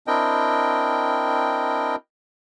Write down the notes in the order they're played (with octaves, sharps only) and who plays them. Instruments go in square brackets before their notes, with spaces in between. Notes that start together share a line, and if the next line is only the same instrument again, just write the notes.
[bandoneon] C4 D4 E4 A#4 D#5 G5